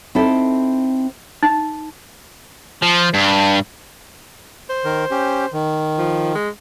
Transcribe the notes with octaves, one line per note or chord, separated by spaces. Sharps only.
C4 D#4 E4 A4
D#4
F3
G2
C5
D#3 A#4
C#4 G4
D#3
F3
G#3